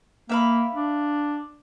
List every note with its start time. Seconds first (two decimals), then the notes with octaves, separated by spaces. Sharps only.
0.29 A#3 E5 F5 B5
0.74 D4